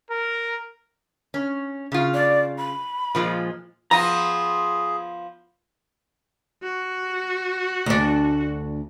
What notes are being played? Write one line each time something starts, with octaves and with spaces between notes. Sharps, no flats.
A#4
C#4
C#3 F4
D5
B5
A#2 F3 G#3
F3 B3 F4 G#4 A#5
F#4
D2 D4